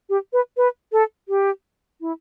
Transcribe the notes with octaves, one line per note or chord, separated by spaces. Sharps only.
G4
B4
B4
A4
G4
E4